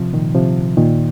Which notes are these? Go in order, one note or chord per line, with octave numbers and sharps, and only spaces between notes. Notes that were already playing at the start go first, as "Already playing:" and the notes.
Already playing: C3 F3
A#2 D#3
C3 F3
A#2 D#3